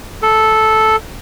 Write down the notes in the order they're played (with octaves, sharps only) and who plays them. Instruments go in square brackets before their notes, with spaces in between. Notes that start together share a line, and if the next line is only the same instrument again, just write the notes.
[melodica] A4